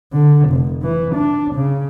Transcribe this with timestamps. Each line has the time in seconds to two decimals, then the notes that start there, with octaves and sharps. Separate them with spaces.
0.13 D3
0.49 F1
0.82 E3
1.14 D4
1.54 C#3